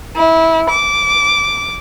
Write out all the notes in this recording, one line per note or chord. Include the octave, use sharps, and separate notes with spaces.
E4
D6